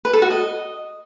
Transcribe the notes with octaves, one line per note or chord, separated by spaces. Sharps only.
B4
A4
F#4
D#5